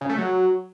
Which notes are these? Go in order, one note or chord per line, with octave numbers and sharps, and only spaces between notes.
C#3
A3
F#3